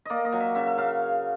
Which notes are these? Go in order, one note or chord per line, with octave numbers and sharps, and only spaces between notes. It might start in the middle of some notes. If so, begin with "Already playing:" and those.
A#3 D5 D#5
D#5
F#3
E5
C#3 E5
E5
C#3 F5